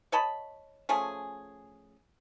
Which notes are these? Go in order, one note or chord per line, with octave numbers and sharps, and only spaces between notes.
C#5 D#5 A5 B5
F3 A3 C#4 G#4